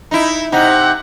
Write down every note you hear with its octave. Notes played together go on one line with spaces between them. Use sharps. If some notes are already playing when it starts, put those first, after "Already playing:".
D#4 E4
C3 D#4 F#5